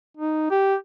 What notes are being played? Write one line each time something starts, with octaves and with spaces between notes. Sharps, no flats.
D#4
G4